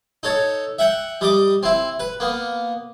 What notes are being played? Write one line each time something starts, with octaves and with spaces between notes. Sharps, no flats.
D#4 A4 C#5
E5 F#5 G5
G3 D#5 D6
C4 E4
B4
A#3 B3